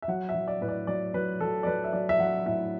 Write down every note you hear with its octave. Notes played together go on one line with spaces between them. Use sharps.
E5
F#3 F#5
E5
F#3
D5
A2 B4
D5
F#3 D5
F#3 B4
F#3 A4
D5
F#3 B4
E5
F#3 D5
E5
F#3 F#5
A2 E5